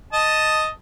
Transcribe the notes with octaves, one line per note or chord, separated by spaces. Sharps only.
D#5 A5